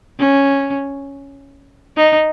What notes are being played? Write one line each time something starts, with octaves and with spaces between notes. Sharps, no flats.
C#4
D#4